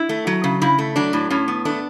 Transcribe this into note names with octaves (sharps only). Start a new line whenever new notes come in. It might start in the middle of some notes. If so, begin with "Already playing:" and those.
Already playing: E4
A3
F#3
C#3
C#3 E4
A3
F#3 D4
A2
A2 C#4
B3
A3 D4